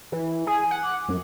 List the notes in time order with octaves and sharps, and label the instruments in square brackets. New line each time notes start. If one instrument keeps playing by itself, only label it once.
[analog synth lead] E3
[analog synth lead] G#4 [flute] G#5
[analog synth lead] F#5
[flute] D6
[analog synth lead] F#2